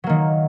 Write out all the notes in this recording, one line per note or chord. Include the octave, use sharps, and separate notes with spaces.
D#3 F#3 A#3